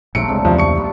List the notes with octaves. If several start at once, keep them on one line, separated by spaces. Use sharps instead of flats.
A#1 G#2 C3 F#3 A3 F4 C#7 D7
C#2 A2 C3 G#3 B3 C4 D4
E2 G2 F3 D#4 F#4
C#6 C#7
G3 B3 F4